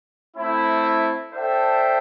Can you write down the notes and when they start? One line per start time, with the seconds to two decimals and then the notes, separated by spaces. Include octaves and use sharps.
0.36 A3 C4 E4
1.32 D4 A4 C5 E5 G5